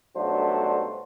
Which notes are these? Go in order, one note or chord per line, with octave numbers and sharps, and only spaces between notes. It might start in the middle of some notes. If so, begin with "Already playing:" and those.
B1 G2 F#3 A3 D4 C5